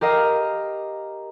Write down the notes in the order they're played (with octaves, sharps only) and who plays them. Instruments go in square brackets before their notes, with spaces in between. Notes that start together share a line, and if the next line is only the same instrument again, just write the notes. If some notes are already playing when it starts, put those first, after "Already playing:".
[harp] G4 A#4 D#5 F5